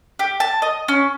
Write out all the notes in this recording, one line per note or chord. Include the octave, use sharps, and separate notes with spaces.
G4
A5
D#5
C#4